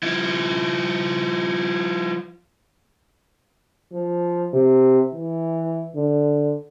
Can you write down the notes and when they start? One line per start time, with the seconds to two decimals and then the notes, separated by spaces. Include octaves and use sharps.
0.03 F3 E4
3.93 F3
4.53 C3
5.14 E3
5.95 D3